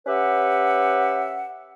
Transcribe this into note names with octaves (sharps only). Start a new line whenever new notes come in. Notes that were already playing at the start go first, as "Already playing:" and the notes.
C#4 G4 B4 E5 F#5